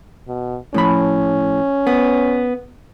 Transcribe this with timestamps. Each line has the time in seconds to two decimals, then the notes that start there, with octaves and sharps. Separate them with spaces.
0.28 B2
0.74 A2 F3 C#4 B5
1.87 B3